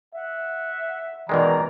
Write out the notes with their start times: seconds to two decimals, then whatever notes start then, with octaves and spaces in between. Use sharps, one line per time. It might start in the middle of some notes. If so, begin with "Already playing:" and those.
0.14 E5 F#5
1.29 B2 D#3 E3 G#3 A#4 D5 A#5